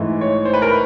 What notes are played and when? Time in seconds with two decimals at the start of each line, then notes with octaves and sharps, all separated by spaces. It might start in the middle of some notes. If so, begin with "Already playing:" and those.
Already playing: G#2 E3 A3
0.21 C#5
0.45 C5
0.53 B4
0.62 A#4
0.70 B4